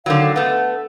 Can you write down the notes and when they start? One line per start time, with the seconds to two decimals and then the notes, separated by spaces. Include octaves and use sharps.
0.06 D3 D#3 F#3 F5
0.36 A3 B3 F#5